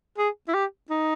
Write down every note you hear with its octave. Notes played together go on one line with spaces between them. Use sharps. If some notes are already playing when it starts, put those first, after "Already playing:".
G#4
E4
G4
D#4